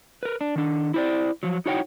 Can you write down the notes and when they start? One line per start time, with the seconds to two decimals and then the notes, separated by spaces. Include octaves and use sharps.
0.23 A#4 B4
0.41 D4
0.56 D#3 D4
0.94 E4 C5 D5
1.43 F3 F#3
1.66 D#4 E4 F#4 C#5 F#5 G5